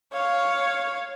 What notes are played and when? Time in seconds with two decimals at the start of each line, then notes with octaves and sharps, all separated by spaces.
0.13 C#5 F5